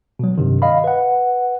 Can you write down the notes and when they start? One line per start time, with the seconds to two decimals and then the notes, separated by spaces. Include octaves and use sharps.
0.19 B2 F#3
0.38 G2 C3 D#3
0.62 D#5 F5 B5
0.84 B4 F#5